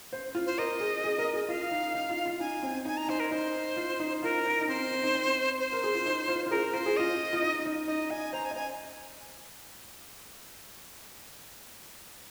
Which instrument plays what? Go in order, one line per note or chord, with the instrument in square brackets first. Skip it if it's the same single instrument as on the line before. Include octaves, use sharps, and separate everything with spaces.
[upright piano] C5
F4
[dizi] C5
[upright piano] A#4 [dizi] D#5
[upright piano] G#4
G#4
A#4
G#4
[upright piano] F4 [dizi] F5
[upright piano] D#4
D#4
F4
F4
[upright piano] D#4 [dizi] G#5
[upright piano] C4
[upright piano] D#4 [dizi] G#5
[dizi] A#5
[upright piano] D#4 [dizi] C5
[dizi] A#4
[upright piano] D#4 [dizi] C5
[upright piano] F4
D#4
[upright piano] F4 [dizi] A#4
[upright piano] D#4
D#4
[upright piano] C4 [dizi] C5
[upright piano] C4
D#4
C4
[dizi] C5
[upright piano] A#4
G#4
F4
D#4
F4
F4
[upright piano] G#4 [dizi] A#4
[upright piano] F4 [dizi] C5
[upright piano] G#4
[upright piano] F4 [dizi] D#5
[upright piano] F4
D#4
D#4
[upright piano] D#4 [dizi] D#5
[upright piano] D#5 [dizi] G#5
[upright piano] C5 [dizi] A#5
[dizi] G#5
[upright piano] D#5
[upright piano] C5 [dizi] G#5